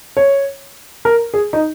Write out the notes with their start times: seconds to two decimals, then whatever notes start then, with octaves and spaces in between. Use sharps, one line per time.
0.17 C#5
1.05 A#4
1.34 G#4
1.53 D#4